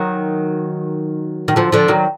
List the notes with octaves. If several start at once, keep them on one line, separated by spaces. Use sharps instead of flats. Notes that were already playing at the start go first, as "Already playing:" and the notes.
Already playing: D#3 F#3
D#3
D3 F3
D3 F3
D#3 F#3